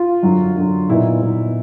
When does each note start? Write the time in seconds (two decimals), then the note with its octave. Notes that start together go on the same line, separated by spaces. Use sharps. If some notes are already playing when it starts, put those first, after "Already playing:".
Already playing: F4
0.23 F#2 D3 F#3
0.55 F#2 D3 F#3
0.89 A#2 F#3 B3 D#4 E4
1.21 A#2 F#3 B3 D#4